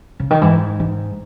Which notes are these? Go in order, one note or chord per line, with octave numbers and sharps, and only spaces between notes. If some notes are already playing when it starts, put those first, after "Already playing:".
C#3
D#3
G#2 E3
D#3